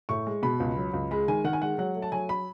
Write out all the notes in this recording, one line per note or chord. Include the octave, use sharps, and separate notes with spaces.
A2 C#6
G#3
B2 B5
C#2
F#3
C#2
G#3 B5
D#3 G#5
D#3 F#5
G#5
G#3 F#5
F#3 F#5
A3
A5
F#3 G#5
B5